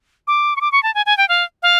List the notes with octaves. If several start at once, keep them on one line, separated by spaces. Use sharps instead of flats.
D6
C#6
D6
C#6
A5
G#5
G#5
G5
F5
F5